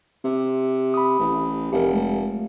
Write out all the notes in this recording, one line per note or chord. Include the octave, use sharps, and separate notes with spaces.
C3
B5 D#6
A1
F1 G4 A#4
G#3 A3